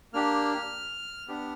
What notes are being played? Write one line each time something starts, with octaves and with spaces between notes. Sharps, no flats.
A#3 D4 G4 F6
B3 D4 G4